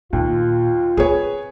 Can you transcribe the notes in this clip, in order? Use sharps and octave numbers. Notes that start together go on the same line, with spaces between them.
D#2 A#2 F4
C4 G#4 B4 C#5